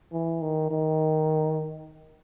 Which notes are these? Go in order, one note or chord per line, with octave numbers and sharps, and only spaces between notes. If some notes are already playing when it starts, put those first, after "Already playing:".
E3
D#3
D#3